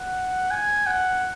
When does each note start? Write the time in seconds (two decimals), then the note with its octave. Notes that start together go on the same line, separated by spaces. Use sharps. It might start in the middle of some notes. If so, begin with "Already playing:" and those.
Already playing: F#5
0.51 G#5
0.86 F#5